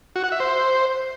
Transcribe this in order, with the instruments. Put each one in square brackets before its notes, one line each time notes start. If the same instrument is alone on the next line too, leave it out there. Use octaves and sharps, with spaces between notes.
[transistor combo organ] F#4
F#5
E5
C5